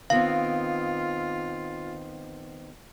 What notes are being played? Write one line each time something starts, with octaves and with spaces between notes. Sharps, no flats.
D#3 B3 C4 F4 F5